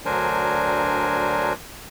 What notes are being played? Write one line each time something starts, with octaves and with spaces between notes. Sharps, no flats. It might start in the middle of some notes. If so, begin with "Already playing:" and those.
D2 F#3 D4 A#4 C5 G#5